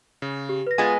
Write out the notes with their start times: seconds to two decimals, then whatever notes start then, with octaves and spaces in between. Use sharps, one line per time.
0.22 C#3
0.49 G4
0.67 B4 A#6
0.78 G#3 B3 F4 G#5 A6